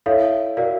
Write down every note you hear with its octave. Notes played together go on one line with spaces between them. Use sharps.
E4 A4 C#5 F5
F#4 A#4 D5 F5